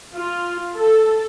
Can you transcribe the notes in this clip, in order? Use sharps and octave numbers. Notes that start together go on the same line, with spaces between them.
F4
A4